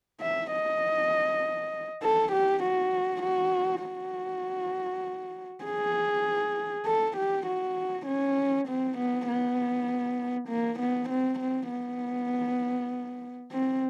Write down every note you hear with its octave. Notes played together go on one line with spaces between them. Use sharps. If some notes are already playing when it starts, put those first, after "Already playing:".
E5
D#5
A4
G4
F#4
F#4
F#4
G#4
A4
G4
F#4
C#4
C4
B3
B3
A#3
B3
C4
C4
B3
C4